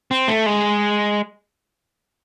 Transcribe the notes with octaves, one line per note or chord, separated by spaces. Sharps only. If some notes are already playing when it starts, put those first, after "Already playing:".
C4
A3
G#3